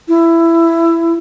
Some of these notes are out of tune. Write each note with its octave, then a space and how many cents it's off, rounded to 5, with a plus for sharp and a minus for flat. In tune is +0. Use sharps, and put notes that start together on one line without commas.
E4 +15